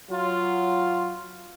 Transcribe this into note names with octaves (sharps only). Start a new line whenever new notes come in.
F#3 F4